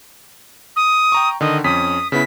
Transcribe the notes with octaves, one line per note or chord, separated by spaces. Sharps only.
D#6
G5 A#5 C#6
D3 D#3 D#5
F2 C#4 D#6 B6
C#3 B3 E4 B6